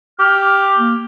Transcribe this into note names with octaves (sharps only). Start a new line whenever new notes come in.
G4 F6
A#3